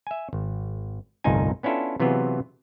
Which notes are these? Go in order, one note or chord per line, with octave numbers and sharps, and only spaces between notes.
E5 G#5
G#1
G1 C2 A2 D#4 F4 G#5
B3 C#4 D4 E4 F4 A4
C3 E3 F#3 B3 F4 G#4